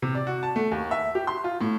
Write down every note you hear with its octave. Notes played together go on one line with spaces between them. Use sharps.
C3
D5
F#4
A5
A3
D#2
E5
G4
C6
F4
A2